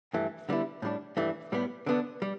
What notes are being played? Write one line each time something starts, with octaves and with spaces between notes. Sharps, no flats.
G2 E3 A3
D3 G3 B3 E4
A2 G3 D4
G2 E3 A3 D4
A2 G3 B3
D3 B3 D4
G3